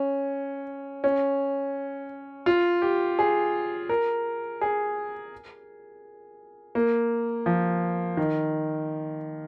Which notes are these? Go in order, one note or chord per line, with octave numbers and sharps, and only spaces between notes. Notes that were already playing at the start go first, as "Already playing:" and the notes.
Already playing: C#4
C#4
F4
G4
G#4
A#4
G#4
A#3
F3
D#3